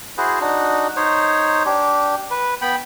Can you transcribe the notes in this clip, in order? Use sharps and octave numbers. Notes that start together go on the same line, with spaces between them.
E4 F#4 G#4 C5
D4 D#4 F#4
D#4 C5 C#5
D4 G4
B4
B3 G5 B5